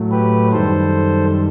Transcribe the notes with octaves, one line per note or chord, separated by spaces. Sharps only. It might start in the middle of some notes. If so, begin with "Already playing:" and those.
Already playing: A2 F#3 A3
G4 B4
F#2 D#3 G3 A4 C5